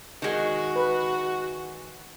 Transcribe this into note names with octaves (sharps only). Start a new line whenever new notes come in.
D#3 G#3 F#4
B4